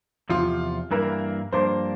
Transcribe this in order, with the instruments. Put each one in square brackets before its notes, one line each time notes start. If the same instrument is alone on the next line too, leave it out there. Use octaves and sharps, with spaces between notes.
[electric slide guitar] E2 C3 F3 [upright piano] F4
[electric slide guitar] G2 E3 A#3 E4 [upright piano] A#4
[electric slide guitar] G2 F3 A#3 D4 [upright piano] C5